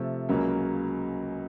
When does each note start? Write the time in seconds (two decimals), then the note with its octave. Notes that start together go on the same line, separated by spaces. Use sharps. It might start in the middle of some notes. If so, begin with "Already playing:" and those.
Already playing: C3 F3 A3
0.29 C#2 C#3 F#3 A#3